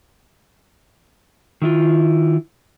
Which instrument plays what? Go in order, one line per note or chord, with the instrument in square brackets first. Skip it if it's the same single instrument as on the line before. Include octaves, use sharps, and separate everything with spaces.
[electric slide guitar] D#3 E4 F4